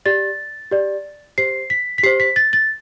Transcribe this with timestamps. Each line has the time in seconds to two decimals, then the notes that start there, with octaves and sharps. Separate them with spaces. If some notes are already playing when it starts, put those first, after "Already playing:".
0.05 G4 D5 A6
0.71 G4 D5
1.38 G4 C5 C7
1.70 B6
1.98 B6
2.03 G4 C5 C7
2.20 B6
2.36 A6
2.53 A6